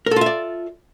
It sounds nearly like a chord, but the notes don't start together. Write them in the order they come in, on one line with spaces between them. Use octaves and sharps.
A#4 A4 F4 E5 D5